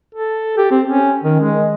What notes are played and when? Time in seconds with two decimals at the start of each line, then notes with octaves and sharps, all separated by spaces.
0.15 A4
0.58 G4
0.71 C4
0.88 C#4
1.24 D#3
1.40 G#3